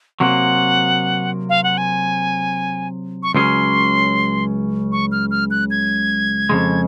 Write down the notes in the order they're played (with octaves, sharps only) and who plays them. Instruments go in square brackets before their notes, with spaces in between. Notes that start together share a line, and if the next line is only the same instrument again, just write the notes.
[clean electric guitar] C3 F#3 A#3 [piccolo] F#5
[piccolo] F5
F#5
G#5
C#6
[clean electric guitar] C#2 C#3 F#3 C#4 [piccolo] C6
[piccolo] C#6
F6
F6
F#6
G#6
[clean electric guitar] F2 C#3 G#3